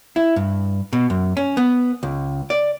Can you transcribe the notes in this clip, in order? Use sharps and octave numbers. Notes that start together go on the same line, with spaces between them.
E4
G2
B2
F#2
C#4
B3
C#2
D5